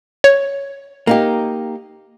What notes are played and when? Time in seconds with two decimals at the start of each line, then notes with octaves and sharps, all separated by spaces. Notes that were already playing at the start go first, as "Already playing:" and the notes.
0.24 C#5
1.07 A#3 D#4 G4